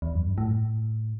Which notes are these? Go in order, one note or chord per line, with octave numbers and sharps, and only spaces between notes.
E2
F#2
G2
A2